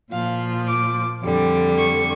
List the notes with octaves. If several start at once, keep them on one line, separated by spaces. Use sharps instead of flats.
A#2 F3 F5
D6
F2 D3 G3
C#6